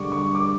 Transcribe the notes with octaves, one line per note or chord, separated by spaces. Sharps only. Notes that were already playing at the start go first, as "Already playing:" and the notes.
Already playing: G2 D3 G3 C#6 D6
C#6
D6